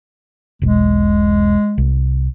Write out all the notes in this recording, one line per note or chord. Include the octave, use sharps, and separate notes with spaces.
E1 B1 G#3
C2